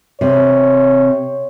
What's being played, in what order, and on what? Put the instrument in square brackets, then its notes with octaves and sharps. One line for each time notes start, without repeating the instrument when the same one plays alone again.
[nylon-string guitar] C3 [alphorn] C#5